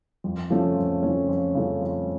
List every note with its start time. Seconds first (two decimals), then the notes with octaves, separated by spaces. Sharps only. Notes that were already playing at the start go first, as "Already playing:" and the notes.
0.24 F2
0.50 C#3 F3 A3 C#4
0.77 F2
1.02 C#3 F3 A3 C#4
1.29 F2
1.55 C#3 F3 A3 C#4
1.81 F2